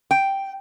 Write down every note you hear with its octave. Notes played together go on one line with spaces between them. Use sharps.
G5